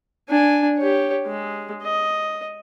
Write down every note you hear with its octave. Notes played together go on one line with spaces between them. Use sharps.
D4 G#5
G4 C#5
G#3
D#5